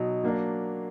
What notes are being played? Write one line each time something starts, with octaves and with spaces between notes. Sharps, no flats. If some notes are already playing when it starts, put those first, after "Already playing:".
Already playing: B2 F#3 D#4
F#3 A#3 D4